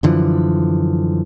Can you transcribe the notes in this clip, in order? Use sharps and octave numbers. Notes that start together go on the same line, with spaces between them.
F#2 D3 E3 F3